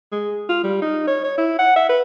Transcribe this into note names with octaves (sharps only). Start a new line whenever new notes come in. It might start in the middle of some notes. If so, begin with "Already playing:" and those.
G#3
F4
G3
D#4
C#5
C#5
E4
F#5
E5
B4